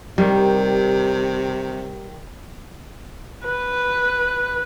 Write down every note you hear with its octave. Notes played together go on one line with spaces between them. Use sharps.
C3 D#3 G3
B4